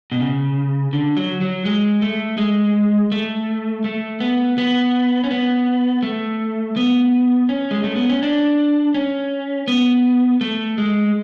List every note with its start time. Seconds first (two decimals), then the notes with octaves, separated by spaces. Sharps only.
0.12 B2
0.20 C#3
0.93 D3
1.17 F#3
1.41 F#3
1.65 G#3
2.02 A3
2.38 G#3
3.12 A3
3.84 A3
4.20 B3
4.58 B3
5.24 C#4
5.31 B3
6.03 A3
6.77 B3
7.49 C#4
7.71 G#3
7.84 A3
7.96 B3
8.09 C#4
8.23 D4
8.94 C#4
9.68 B3
10.41 A3
10.78 G#3